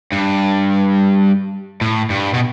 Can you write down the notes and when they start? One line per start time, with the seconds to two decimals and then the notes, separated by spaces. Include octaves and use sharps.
0.12 G2
1.81 A2
2.10 G2
2.34 B2